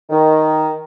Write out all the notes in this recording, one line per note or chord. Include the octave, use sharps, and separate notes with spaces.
D#3